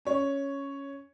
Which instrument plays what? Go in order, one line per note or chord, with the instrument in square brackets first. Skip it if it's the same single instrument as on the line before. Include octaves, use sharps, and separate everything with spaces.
[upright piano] C#4 C#5